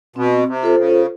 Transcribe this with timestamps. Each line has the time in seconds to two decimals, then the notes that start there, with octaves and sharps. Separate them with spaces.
0.16 B2 C4
0.48 C3
0.63 F4 A4 C5
0.78 C#3